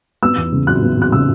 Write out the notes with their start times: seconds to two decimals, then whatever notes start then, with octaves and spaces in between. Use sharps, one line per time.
0.22 B3 E6
0.37 E2
0.52 C#3
0.67 F#3 F#6
0.83 B3
0.97 E2 F#6
1.12 C#3 E6